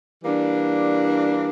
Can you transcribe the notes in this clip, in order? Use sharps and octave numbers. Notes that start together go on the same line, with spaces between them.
E3 G3 A#3 D4